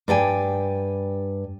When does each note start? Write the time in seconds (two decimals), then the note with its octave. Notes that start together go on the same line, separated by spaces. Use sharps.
0.08 G2 D5 G5 G#5